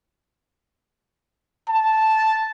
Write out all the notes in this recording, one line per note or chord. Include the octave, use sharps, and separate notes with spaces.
A5